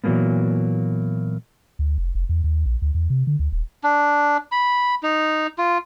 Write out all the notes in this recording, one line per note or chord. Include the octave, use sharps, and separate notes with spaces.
A#2 E3 F#3 G#3 A#3 B3
D2
F1
F1
E2
D#2
A#1
D2
E2
C3
D3
D2
D#1
D4
B5
D#4
F4